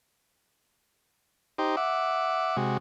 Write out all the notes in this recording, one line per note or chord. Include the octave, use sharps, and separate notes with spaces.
D#4 G4 C5
E5 F#5 D6
C3 G#3 F#4